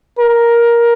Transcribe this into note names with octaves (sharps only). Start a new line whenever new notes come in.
A#4